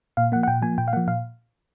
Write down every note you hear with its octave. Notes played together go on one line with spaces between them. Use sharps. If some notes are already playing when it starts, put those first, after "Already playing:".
A#2 F5
F3 A#3 F#5
F#5
A#2 G5
F3 A#3 G#5
A#2 G5
F5
F3 A#3 F#5
A#2 F5